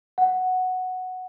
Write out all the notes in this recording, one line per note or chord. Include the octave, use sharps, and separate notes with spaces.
F#5